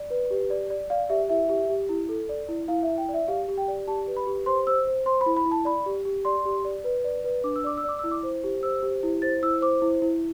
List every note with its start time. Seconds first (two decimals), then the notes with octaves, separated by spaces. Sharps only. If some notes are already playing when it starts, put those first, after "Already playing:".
Already playing: D5
0.10 B4
0.31 G4
0.50 D5
0.70 D5
0.90 D5 F5
1.09 G4 E5
1.29 E4 E5
1.49 G4
1.69 G4
1.89 E4
2.09 A4
2.29 D5
2.49 E4
2.68 E4 F5
2.83 E5
2.88 E4
2.98 G5
3.09 D5
3.14 E5
3.28 G4 F5
3.48 G4
3.58 G5
3.68 D5
3.88 G4 A5
4.07 B4
4.17 B5
4.27 G4
4.46 C5 C6
4.67 C5 E6
4.87 C5
5.06 C5 C6
5.21 B5
5.26 E4
5.37 B5
5.46 E4
5.51 A5
5.65 D5 B5
5.86 G4
6.05 G4
6.25 D5 C6
6.45 G4
6.65 D5
6.84 B4
7.04 D5
7.24 B4
7.44 D4 D6
7.56 E6
7.64 D5 D6
7.77 E6
7.84 D5 D6
7.99 E4 E6
8.11 D6
8.23 C5
8.44 G4
8.63 C5 E6
8.83 G4
9.03 E4
9.22 C5 A6
9.42 E4 E6
9.61 C5 D6
9.82 E4
10.02 E4